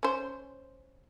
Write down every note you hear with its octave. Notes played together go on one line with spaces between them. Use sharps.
C#4 C5